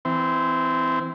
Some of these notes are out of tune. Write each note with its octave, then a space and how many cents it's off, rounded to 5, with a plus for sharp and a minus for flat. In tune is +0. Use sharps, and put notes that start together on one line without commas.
E3 +0 C4 -20